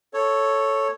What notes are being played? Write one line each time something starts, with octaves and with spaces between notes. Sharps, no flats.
A4 C#5